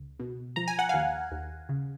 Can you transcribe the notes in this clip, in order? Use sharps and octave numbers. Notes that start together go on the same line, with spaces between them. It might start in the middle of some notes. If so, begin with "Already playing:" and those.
Already playing: C#2
B2
F3 A#5
G#5
F#5
D#2 F5 G#5
D#2
C#3